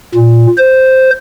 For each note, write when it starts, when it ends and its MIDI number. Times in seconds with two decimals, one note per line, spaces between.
0.15 0.46 46
0.58 1.11 72